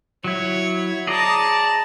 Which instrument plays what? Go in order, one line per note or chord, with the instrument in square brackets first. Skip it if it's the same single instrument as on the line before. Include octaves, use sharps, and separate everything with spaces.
[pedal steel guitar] F#3 E4 [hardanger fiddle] C#5
[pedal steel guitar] G#4 D5 D#5 [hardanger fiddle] A5 A#5